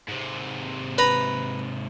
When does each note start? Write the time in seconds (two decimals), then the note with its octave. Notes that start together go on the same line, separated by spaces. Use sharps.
0.08 G#2 C3
0.98 B4 A#5 B5